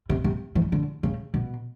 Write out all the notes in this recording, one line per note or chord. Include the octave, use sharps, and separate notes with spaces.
C3
C3
E3
D3
C#3
B2